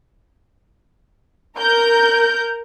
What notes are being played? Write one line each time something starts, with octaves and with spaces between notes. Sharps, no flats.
A#4 A#5 G6